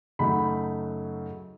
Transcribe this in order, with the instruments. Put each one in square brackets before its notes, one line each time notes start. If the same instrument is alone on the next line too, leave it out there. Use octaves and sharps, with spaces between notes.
[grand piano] F#2 C#3 F#3 A3 D#4 B5